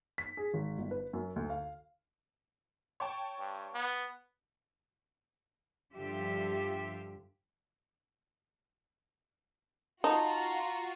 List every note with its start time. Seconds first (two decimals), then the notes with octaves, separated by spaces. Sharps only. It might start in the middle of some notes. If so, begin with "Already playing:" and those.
0.18 B6
0.37 G#4
0.54 G#1
0.78 G1
0.91 B4
1.13 F#2
1.36 D2
1.50 F5
3.00 C#5 G5 A5
3.39 G2
3.74 B3
5.94 G2 D3 F3 F4 G4 E5
10.04 D#4 F4 F#4 A5 A#5